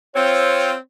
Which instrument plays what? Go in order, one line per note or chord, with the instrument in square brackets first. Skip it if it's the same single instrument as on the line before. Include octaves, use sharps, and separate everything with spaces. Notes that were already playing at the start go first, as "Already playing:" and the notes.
[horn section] C4 F4 [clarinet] C#5